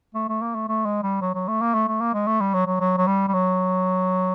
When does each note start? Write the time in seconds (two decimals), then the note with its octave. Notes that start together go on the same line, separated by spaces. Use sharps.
0.15 A3
0.28 A3
0.42 A#3
0.55 A3
0.68 A3
0.85 G#3
1.03 G3
1.21 F#3
1.35 F#3
1.48 A3
1.61 A#3
1.74 A3
1.88 A3
2.01 A#3
2.14 G#3
2.27 A3
2.41 G3
2.54 F#3
2.66 F#3
2.80 F#3
2.97 F#3
3.07 G3
3.28 G3
3.34 F#3